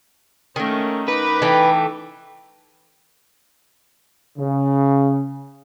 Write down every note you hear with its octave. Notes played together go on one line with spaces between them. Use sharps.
D#3 A3 A#3 C#4
D#4 B4 D6
E3 A3 G5
C#3